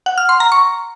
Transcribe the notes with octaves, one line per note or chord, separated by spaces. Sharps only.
F#5
F6
C6
A#5
C#6